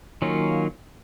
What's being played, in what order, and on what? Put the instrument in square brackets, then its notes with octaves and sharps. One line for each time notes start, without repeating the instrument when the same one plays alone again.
[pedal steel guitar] D#3 F#3 A#3 C#4 F4